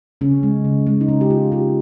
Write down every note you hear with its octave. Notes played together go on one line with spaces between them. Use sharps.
C#3 C#4
G#3
C#3
G#3
D#4
C#3 C#4
G4
G#3 F4
C#3 G4